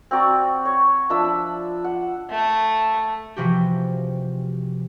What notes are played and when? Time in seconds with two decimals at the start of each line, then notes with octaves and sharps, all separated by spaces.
0.11 C4 F#4 D5 A#5
0.65 C#5
1.10 F3 D4 E5 B5
1.84 F#5
2.31 A3
3.36 C3 E3 F3 F#4 G4